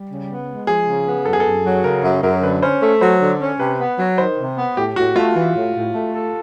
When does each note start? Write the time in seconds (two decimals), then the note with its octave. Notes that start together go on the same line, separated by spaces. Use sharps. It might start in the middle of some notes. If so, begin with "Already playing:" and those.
Already playing: G3
0.09 C#3
0.28 B3
0.48 G#3
0.67 F3 G#4
0.86 C#3
1.07 B3
1.25 F#2 A4
1.33 G#4
1.40 A4
1.45 F#2
1.64 F#3
1.84 C#3 A#4
2.03 F#2
2.23 F#2 A#4
2.43 D3 B4
2.62 C#4 C5
2.82 A3
3.01 F#3 C5
3.21 D3
3.41 C#4
3.59 C3 B4
3.80 B3
3.99 F#3
4.18 D#3 C5
4.38 C3
4.57 B3
4.77 A2 G4
4.96 A2 F#4
5.16 A3 F4
5.35 E3
5.55 A2
5.74 A2
5.94 A3
6.14 A4